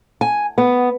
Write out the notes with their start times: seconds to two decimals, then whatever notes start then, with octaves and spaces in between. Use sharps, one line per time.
0.21 G#5
0.58 B3